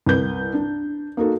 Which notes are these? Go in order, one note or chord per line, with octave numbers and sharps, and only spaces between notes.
C2 B4 G6
D4
A#3 D#4 F#4 A4